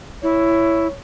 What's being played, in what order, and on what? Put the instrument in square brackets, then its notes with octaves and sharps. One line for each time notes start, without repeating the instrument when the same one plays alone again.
[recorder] E4 [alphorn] C#5